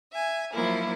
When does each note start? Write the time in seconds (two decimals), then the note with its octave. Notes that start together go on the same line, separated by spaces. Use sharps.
0.12 E5 G#5
0.52 F3 F#3 A#3 D#4 E4